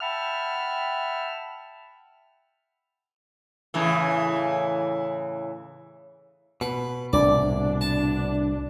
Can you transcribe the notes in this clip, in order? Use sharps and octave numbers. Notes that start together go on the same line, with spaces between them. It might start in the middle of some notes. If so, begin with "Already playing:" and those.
E5 F#5 G5 A5 B5 F6
A2 C#3 E3
B2 B4
C2 A2 D4 D5
A5